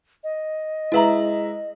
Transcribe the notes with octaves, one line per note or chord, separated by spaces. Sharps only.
D#5
G#3 E4 B4 E5 A#5 F#7